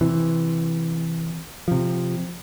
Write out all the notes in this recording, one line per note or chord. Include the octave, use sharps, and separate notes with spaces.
C3 E3
C3 F3